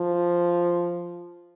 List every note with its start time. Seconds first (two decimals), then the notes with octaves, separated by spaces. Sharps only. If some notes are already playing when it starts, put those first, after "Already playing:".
Already playing: F3